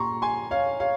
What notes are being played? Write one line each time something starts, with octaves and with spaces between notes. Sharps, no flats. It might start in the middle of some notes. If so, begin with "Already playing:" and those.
Already playing: A#2 A#5 C6 C#6
G#5 C6
C#5 F5
C#5 F5